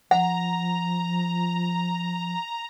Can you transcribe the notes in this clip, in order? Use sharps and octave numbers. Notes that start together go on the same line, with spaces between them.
F3 F#5 A#5